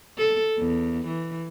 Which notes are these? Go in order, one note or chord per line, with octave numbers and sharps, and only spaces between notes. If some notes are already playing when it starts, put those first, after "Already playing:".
A4
E2
E3